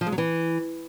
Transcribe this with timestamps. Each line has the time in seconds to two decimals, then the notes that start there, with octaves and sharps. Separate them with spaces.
0.01 F3
0.07 G#3
0.12 F#3
0.18 E3